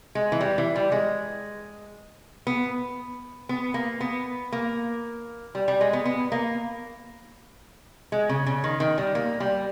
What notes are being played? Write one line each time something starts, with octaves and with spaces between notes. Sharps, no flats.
G#3
E3
G3
E3
G3
G#3
B3
B3
A#3
B3
A#3
G3
G3
G#3
B3
B3
A#3
G#3
C#3
C#3
D#3
D#3
G3
A#3
G3